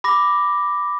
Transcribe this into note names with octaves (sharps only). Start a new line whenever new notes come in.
B5 D6 A#6